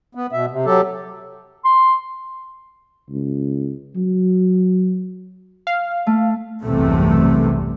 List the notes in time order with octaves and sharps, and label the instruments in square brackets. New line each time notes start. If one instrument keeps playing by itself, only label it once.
[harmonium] B3
B2 E5
C3
F#3 G4 A4
[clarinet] C6
[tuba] C#2
F#3
[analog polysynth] F5
[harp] A3
[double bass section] B1 E2 G2 C3 A3